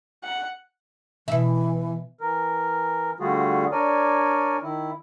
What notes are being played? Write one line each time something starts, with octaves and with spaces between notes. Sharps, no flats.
F#5
B2 E3 E5
E3 A#4
D3 G3 A3 F4 F#4 G#4
D4 A#4 C#5 D5 G#5
D#3 E4